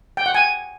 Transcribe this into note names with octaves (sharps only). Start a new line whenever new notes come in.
G5
F#5
G#5